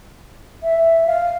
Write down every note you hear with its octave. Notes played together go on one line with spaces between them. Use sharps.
E5
F5